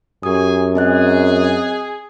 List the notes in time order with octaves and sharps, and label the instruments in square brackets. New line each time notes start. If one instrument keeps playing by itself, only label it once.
[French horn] F#2 [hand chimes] G4 D#6 [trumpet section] G#4 G#5
[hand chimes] C4 D#5 F#6 [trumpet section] G#4